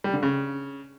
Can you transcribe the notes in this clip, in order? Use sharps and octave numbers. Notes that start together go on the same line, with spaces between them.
G3
D3
C#3